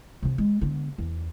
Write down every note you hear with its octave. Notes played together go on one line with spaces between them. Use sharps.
C3 F3
G#3
D3 B3
E2